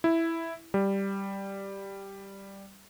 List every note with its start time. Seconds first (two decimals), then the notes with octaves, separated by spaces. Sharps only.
0.04 E4
0.74 G3